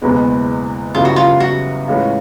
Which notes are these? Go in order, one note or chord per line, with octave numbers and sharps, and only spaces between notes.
F#1 E2 B2 G#3 B3
G1 F#2 C#3 E3 G3 F4
F#4
F4
F#4
A2 E3 G#3 C#4 F4